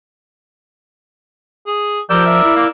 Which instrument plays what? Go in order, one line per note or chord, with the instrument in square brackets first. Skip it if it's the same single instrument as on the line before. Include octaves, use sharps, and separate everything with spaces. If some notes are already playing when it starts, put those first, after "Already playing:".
[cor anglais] G#4
[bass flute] F3 [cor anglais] G4 [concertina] A#4 D5 E6
[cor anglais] E5
[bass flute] E4
[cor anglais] A#3